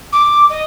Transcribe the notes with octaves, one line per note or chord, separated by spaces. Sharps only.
D6
D#5